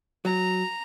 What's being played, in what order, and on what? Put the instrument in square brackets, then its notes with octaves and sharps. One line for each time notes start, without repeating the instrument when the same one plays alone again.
[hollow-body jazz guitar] F#3 [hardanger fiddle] A#5